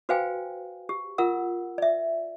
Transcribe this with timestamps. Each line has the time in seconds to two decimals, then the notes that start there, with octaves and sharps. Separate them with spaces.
0.09 F#4 B4 C5 F5 G5 G#5
0.89 G4
1.18 F4 A#4 F#5 E6
1.78 D5 E5